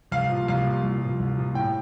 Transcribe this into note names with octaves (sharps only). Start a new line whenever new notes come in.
C2 F5
A#2 F3
C2 F5
A#2 F3
C2
A#2 F3
C2
A#2 F3
A2 G5